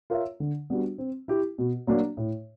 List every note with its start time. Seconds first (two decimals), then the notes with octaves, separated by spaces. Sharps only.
0.10 F4 A#4 C#5 E5
0.40 D3
0.70 G3 B3 D4 F#4
0.98 C4
1.28 E4 G4
1.58 B2
1.87 F#3 A#3 D4
2.17 A2